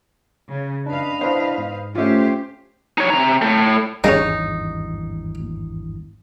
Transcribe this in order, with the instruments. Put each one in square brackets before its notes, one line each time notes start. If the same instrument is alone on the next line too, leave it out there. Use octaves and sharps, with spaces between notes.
[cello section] C#3
[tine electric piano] D4 [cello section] B4 D#5 F5
[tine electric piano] B3 D4 E4 [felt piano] C5
[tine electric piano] G#2
[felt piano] A3 F4 [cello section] C#4 G4 C5
[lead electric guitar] D#4 C#5
C3 A#5
A2 A3
[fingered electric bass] G#1 E2 G2 [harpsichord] G3 G#3 C#4 [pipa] D#4